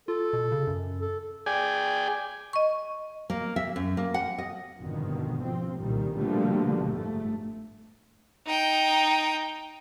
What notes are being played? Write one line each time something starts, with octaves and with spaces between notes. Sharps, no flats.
F4 A4
B2
C#3
F#2
A4
G#4 D5 G5 G#5
D#5 C#6
A#3
E5
F#2
A#3
F#5
D#5
G1 F2 G#2 B2 D3 D#3
F3 C4
C2 A#2 D#3 G3
B2 D3 F3 G3 A3 A#3
G1 G#2 A3
D#4 G5